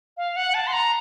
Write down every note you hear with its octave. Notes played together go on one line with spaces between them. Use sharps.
F5
F#5
A5
C6
A#5